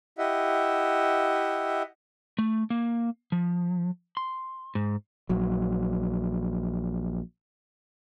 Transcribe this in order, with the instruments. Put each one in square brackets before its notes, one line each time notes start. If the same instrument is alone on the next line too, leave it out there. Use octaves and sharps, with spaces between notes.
[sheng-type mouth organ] E4 G4 D#5 E5 F#5
[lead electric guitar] A3
A#3
F3
C6
G#2
[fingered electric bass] A#1 F#3